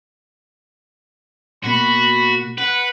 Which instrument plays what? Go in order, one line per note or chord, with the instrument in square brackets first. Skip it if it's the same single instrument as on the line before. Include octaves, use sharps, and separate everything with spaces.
[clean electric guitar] B2 A#3 [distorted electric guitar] F#4 [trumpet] B5
[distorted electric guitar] B4 [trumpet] F#5